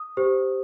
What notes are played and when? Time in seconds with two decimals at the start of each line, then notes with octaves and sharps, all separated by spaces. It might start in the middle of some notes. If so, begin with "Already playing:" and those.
Already playing: D#6
0.17 G4 C5